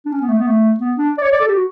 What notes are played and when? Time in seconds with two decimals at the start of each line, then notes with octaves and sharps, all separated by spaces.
0.05 D4
0.11 C#4
0.21 B3
0.28 A3
0.38 B3
0.46 A3
0.80 B3
0.97 D4
1.17 D5
1.22 C#5
1.31 D5
1.40 A4
1.47 G4
1.55 F#4